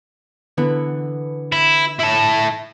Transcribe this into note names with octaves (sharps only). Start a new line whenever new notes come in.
D3 E3 B3
E4
E4 A5